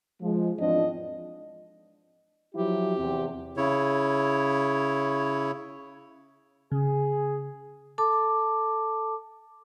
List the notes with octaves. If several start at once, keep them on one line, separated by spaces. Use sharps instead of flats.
F3 G#3
E2 G#2 F3 C4 D4 D#5
F3 F#3 E4 G4
E2 C3
C#3 E4 C#5
C#3 G#4
A4 A5 D6